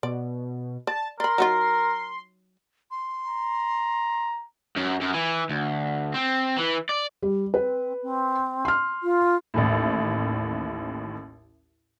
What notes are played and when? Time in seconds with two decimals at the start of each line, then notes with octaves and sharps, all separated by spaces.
0.03 B2 D5
0.87 D5 A5
1.20 A#4 D5 B5 C6
1.38 F#3 D#4 F4
2.91 C6
3.27 A#5
4.76 F#2
5.01 F#2
5.14 E3
5.49 D2
6.14 C4
6.58 E3
6.89 D5
7.22 G3
7.54 C4 B4
8.02 C4
8.65 C6 F6
9.03 F4
9.54 A1 D#2 A2